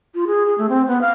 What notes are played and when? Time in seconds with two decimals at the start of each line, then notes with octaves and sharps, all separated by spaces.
0.15 F4
0.27 G#4
0.46 G#4
0.58 A3
0.69 C4
0.88 B3
1.01 F5